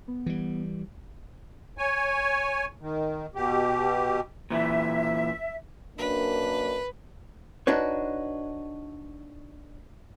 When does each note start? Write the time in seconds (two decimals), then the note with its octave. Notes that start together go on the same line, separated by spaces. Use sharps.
0.08 B3
0.26 E3 G3
1.78 C#5 G#5
2.81 D#3
3.35 B2 G4
4.50 A#2 E3 E5
5.98 F#2 A#3 D4 B4
7.67 D4 D#4 F#4 B4 C#5